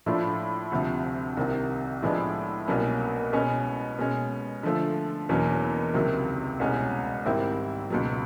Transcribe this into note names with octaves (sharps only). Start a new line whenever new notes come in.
A2 F3 A3 D4 F4
D2 C3 F3
C2 C3 D#3
A2 F3 G#3 B3 D4
C2 B2 F#3 A#3 C#4
B2 G#3 C#4
B2 G#3 C#4
D3 F3 A3
E2 B2 F#3 A#3 C#4
C#2 C3 D#3 F#3
C2 B2 G#3 C#4
G#2 D#3 G3 C4 E4
C#2 B2 F#3